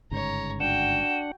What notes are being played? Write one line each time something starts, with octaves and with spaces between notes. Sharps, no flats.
G1 G#2 C#3 C#5 A#5
D4 F#4 F#5 G5 E7